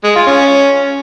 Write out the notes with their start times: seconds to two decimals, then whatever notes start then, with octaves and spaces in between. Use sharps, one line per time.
0.04 G#3
0.15 F4
0.26 C#4